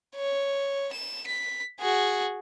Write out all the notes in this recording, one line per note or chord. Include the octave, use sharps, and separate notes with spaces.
C#5
E7
B6
F#4 G#4